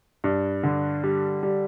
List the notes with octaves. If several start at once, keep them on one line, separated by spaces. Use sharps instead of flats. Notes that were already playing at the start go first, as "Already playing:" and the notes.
G2
D3
G3
G3